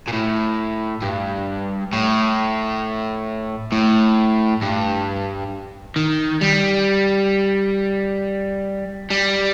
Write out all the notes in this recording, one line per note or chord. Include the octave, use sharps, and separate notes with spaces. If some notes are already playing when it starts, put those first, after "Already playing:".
A#2
A2
G2
A2
A2
G2
D#3
G3
G3